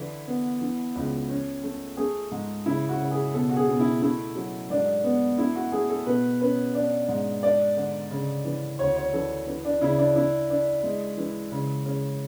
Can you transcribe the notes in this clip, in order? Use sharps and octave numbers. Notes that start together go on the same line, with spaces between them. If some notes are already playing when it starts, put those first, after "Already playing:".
Already playing: D3 E3 E4
B3
E3
C#2
C#4
A3
A3 G#4
G#2
C#3 E4
F#4
C#3
G#4
B2 A4
F#4
G#4
B2
E4
A3 E4
F#3
G#2 D4
B3
A3 E4
F#4
A3 G#4
A4
B2 B4
C#4 B4
D4
G#2
D4 D5
D3
C#3
E3
D2 C#5
C#5
E3 A4
E3
D4
C#3 E4
D4
D4 E4
D4
G#3
E3
C#3
C#3